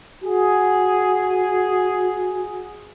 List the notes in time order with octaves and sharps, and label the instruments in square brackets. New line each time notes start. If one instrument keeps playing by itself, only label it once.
[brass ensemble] F#4 G#4